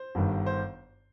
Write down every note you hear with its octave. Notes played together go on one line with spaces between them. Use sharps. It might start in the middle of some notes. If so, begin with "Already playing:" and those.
Already playing: C5
G1 G2 D#3
C5